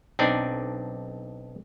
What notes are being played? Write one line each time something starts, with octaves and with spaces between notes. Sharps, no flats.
B1 C4 D4 D#4 D5